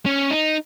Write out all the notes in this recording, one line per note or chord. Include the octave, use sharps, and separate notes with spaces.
C#4
D#4